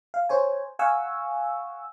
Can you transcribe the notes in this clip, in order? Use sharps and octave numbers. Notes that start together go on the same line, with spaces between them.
F5
C5 C#5 G#5
F5 F#5 G#5 C#6 E6